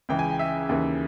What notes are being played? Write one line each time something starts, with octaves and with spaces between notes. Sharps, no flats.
C#2 C#3 E3 G5
G#5
G5
E5
D#2 C#3 E3